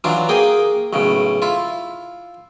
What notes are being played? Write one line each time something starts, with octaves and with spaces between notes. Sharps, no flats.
E3 F#3 D4 F4
A#3 G#4 G5 D#6
B1 A2 C#3
E4 F4